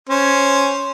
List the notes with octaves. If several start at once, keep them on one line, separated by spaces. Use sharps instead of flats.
C#4 C5